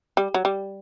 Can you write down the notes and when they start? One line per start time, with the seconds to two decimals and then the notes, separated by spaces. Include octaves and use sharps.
0.17 G3
0.34 F#3
0.45 G3